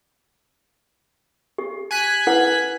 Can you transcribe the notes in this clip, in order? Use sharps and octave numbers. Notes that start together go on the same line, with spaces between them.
G4
G#5 F#6 B6
E4 B4 F#5